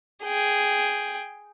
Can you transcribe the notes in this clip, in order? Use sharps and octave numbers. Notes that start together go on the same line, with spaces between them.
G#4 G5